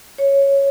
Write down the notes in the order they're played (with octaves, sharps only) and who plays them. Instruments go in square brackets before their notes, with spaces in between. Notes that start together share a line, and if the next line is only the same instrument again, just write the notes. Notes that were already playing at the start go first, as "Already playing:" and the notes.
[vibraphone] C#5